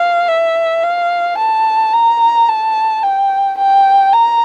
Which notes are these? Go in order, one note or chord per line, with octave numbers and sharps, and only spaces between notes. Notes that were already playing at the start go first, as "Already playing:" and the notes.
Already playing: F5
E5
F5
A5
A#5
A5
G5
G5
A#5